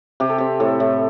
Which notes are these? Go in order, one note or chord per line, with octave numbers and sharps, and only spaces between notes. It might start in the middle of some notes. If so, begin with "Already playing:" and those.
C3 G4
A4
C4 G4
A2 A4
A2